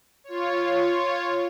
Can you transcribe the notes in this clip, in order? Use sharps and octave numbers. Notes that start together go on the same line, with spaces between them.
F4 C#5